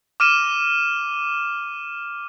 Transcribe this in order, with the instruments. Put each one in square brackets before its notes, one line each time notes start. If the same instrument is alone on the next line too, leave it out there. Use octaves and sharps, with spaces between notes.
[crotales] D6 F6 D#7 E7